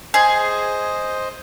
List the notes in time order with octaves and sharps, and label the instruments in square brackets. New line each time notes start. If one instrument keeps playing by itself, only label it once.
[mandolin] G#4 [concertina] C5 D#5